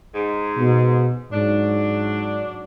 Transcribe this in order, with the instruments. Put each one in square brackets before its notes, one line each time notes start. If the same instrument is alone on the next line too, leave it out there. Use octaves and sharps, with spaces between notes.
[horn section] G#2
[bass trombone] B2
[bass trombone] G#2 [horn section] F#3 D4